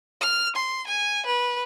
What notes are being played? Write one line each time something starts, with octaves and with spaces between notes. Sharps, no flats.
F6
C6
G#5
B4